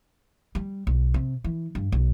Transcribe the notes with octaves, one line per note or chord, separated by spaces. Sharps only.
G3
B1
C3
E3
G2
B1